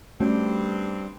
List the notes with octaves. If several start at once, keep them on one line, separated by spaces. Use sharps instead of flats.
G2 G3 A3 C4 C#4 F#4